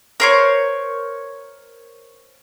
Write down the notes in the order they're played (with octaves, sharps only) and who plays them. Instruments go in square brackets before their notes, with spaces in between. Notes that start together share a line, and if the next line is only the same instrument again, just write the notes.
[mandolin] A#4 C5 C#5